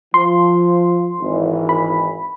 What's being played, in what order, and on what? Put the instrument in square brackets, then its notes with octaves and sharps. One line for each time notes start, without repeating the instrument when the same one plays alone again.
[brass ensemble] F3 [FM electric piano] C6
[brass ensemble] G#1 E3
[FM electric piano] B5